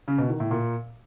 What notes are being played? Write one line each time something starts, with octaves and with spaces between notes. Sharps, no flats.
C#3
B2
D#3
A2
A#2